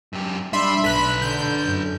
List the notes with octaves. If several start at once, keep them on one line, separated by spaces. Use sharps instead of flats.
F#2 G4
G3 D4 E5 B5 C6
B1 A4 B4 B5 F#6 B6
D3 G6
F#2